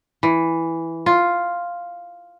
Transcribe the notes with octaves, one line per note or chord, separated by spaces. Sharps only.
E3
F4